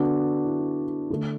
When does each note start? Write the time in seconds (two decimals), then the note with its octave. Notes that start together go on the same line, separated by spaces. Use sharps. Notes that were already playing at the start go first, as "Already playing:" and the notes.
Already playing: D3 B3 D4 F#4
0.45 E4
1.10 D3 A3